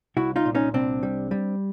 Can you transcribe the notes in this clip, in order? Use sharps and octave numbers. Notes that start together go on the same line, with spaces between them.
C2 E4 F#4
D#4 F4
A#2
C#4 D#4
C2 C4 D4
G3
G3